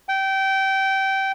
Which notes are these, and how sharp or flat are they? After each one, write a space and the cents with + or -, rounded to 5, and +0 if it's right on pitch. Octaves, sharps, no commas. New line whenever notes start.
G5 -20